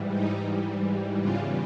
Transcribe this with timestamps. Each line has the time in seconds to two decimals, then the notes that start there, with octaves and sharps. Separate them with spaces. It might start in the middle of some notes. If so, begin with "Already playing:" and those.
Already playing: G#2 E3 G3
0.11 D#4
1.20 E2 C#3 E3 G3 F4